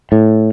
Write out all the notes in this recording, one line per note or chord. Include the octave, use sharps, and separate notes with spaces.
A2